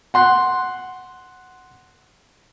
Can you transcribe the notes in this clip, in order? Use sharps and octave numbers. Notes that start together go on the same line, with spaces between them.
F#5 C6 F#6